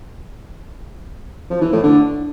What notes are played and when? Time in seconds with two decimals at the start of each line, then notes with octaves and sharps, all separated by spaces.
1.50 F3
1.61 E3
1.72 A2
1.84 D3